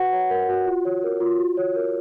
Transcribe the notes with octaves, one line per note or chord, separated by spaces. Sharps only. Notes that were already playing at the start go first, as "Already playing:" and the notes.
Already playing: F#4 B4 F#5
C#5
A#4
F#4
F4
C#5
A#4
F4
F#4
C#5
A#4